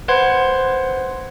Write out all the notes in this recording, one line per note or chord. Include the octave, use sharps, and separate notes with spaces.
B4 C5 F#5 C6 G#6